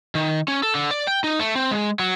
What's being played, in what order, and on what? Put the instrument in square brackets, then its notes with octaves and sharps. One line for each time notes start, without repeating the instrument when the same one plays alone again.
[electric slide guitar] D#3
C#4
A4
D3
D5
G5
D#4
A3
C4
G#3
F#3